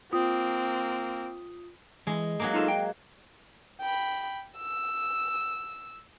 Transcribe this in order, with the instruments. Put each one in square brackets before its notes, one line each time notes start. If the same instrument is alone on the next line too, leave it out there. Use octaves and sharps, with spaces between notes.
[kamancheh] A#3 C4 [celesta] F4 D#6
[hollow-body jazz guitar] E3 [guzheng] G#3
[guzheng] F#3 G#3 A#3
[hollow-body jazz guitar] D#4 F4 A4
G5
[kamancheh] G5 B5
E6